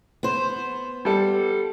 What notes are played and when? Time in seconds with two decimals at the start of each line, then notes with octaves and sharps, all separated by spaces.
0.23 B3 C5
1.05 G3 A4